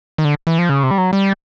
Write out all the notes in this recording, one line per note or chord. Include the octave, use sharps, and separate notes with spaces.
D#3
D3
E3
F3
C#3
C3
G3
F#3
G3